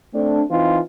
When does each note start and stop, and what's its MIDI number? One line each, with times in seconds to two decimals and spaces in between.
0.13 0.42 57
0.13 0.42 60
0.13 0.42 62
0.50 0.80 52
0.50 0.80 60
0.50 0.80 63
0.50 0.80 65